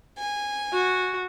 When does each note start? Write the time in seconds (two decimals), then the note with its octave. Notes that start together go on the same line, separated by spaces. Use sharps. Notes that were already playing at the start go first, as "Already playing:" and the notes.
0.18 G#5
0.73 F#4